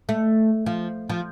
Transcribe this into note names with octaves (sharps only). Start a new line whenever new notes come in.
A3
F3
F3